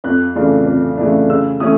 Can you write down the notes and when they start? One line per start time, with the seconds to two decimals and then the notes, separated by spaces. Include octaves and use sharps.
0.04 F2 F#6
0.35 C#3 E3 A3 D4
0.66 F2
0.97 C#3 E3 A3 D4
1.29 C#3 E6
1.60 E3 A3 C#4 D#6